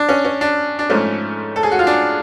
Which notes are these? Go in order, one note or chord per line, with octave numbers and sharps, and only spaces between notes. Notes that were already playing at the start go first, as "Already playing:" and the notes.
Already playing: D4
C#4
C#4
D4
D4
G#2 F3 A3 C#4
A4
G#4
F#4
F4
D4